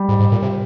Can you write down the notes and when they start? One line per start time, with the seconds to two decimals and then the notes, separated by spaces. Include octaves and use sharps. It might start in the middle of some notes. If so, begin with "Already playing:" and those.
Already playing: G3
0.09 G#2
0.20 G#2
0.32 A#2
0.42 C3